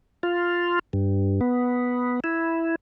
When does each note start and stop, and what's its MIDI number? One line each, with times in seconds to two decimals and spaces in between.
0.23 0.79 65
0.93 1.40 43
1.41 2.20 59
2.24 2.75 64